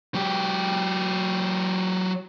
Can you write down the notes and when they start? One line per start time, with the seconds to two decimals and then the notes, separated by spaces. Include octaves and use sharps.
0.15 F#3 G4